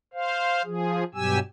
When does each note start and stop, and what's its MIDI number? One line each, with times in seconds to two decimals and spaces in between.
0.13 0.62 72
0.13 0.62 77
0.65 1.04 53
0.65 1.04 68
1.14 1.39 43
1.14 1.39 47
1.14 1.39 54
1.14 1.39 67
1.14 1.39 80
1.14 1.39 88